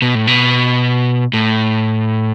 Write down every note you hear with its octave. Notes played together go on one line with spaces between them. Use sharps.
B2
A2
B2
A2